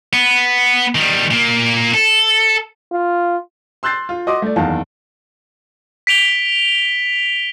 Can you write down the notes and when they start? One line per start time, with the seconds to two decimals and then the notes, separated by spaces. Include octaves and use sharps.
0.13 B3
0.95 D#3 G3
1.31 A#2 A#3
1.94 A4
2.92 F4
3.83 C6 E6 F#6 G6 A6 C7
4.09 F4
4.27 F#4 D#5 C6 D6 D#6
4.42 A3 D5
4.56 F#1 E2 D#3 F5 A5
6.07 B6 D7 F7 G7